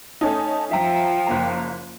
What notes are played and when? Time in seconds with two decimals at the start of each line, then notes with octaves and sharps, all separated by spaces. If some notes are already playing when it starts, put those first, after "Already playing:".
0.21 A3 C#4 D#4 A5
0.71 F3 E5 G5 A#5
1.27 F#1 A#3 A#5